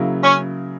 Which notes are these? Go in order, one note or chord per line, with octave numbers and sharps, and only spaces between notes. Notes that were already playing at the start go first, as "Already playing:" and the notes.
Already playing: C#3 F#3 A#3 E4
C#4